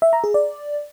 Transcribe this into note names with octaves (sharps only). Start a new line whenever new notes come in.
E5
A#5
G#4
D5